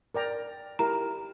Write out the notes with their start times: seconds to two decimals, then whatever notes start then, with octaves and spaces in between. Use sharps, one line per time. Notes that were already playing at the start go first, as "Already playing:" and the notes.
0.15 A#4 D5 G5 A#5
0.79 E4 G4 A#4 A#5